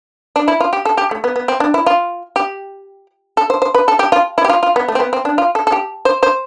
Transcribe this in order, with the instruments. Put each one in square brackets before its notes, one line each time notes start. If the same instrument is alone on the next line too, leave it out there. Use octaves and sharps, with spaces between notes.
[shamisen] D4
E4
F4
G4
A4
G4
A3
B3
B3
C4
D4
E4
F4
G4
A4
C5
C5
B4
A4
G4
F4
E4
G4
F4
F4
B3
A3
C4
B3
C4
D4
F4
A4
A4
G4
C5
C5